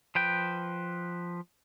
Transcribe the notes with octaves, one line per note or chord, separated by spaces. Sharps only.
F3 B4 G5